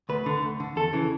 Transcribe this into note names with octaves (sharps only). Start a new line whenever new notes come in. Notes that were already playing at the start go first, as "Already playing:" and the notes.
D2 B4
D3
D2
D3
E2 A4
C#3 E3